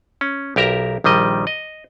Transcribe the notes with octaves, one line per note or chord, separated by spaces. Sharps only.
C#4
B1 G4 A#4 E5 A#5
A#1 D#3 G3 D#5
D#5